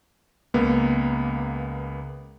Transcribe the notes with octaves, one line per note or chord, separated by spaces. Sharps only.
C#2 A#3 B3